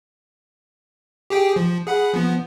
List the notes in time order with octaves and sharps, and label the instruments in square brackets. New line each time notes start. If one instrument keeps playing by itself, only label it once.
[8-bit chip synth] G4 G#4 G5
F3
G#4 F#5 B5
F3 B3